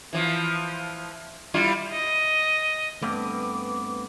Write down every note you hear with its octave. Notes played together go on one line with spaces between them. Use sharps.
E3 F3
G3 E4 F4
D#5
G2 A3 B3 C4 D6